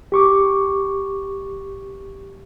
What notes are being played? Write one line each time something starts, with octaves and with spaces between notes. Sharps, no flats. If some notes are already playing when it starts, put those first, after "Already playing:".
G4 C#6 D6